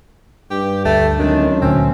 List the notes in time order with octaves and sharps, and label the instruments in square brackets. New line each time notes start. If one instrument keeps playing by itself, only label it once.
[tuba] G2 [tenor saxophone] G4
[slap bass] D2 [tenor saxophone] A3
[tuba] F#2 [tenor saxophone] D#3 [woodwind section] G#3 C4 D4
[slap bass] D2 A#2 D3 [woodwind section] E3 A3 C#4 [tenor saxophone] C4